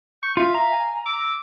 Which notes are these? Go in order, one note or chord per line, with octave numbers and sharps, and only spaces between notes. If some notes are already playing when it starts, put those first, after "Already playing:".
C#6 G6
F4 E5 F5
A#5
G#5
D6 E6